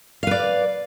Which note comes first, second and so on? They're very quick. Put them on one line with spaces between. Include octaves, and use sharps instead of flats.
F5 B4 D5